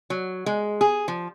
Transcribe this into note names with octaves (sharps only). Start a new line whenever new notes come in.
F#3
G#3
G#4
F3